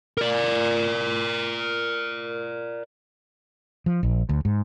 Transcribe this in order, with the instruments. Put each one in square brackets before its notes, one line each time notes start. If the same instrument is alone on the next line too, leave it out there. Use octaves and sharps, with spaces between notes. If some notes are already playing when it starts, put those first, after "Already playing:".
[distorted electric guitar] A#4 D5
[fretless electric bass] F3
A#1
D2
G#2